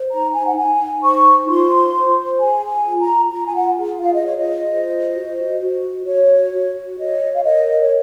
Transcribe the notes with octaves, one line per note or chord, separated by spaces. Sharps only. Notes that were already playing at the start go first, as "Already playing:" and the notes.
Already playing: C5
D#4 A#5
G#5
F#5
D#4 G#5
C5 C#6
F4 C6
C5
G#4 G#5
G#5
F4
A#5
F4 A#5
G#5
F#5
G#4
F5
D#5
F4 C#5
D#5
C5
F#4
F#4
F#4 C#5
F#4
C#5 D#5
F5
A#4 D#5
C#5